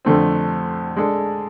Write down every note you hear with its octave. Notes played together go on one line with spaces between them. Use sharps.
F2 D3 A3 C4
G#3 D4 A4